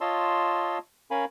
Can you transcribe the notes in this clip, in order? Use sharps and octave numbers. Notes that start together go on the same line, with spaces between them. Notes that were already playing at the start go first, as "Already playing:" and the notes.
F4 C#5 D#5 A5 C6 E6
C#4 A#4 F5 G#5 B5